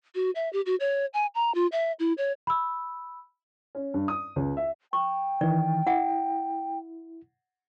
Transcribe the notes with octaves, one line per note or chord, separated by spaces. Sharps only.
F#4
E5
G4
F#4
C#5
G#5
A#5
F4
E5
E4
C#5
B5 E6
C#4
G2
D#6
C#2
E5
G5 C#6
D#3 E3 D5
E4 F#5